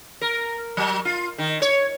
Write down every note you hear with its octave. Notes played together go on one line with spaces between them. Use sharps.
A#4
F#3
F4
D#3
C#5